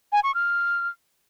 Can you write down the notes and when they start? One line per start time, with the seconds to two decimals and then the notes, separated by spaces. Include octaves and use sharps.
0.12 G#5
0.23 C#6
0.35 F6